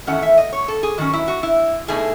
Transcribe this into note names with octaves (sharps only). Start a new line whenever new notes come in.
E2 D#3 A3 C#4 E4 F#5
E5
D#5
C#5
A4
G#4
D#3 F#3 C#4 F#4
E4
F#4
E4
B2 A3 D#4 G#4